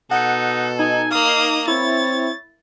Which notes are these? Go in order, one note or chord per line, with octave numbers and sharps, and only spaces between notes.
B2 D#4 A4 F#5
D#4 G#5
A#3 F5 D#6
C4 E4 C#5 A6